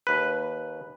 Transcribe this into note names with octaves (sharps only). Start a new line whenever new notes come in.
D#2 B4